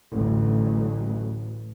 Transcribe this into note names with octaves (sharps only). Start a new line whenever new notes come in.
A1 D2 F#3